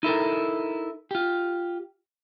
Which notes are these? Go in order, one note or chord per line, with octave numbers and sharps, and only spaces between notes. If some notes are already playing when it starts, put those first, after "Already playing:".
D#4 E4 A4 A#4
F4 G4